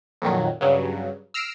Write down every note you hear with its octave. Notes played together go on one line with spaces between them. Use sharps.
F2 A#2 D#3 F#3
G2 C#3 F#3
E6 F6 A#6 C7 D7 E7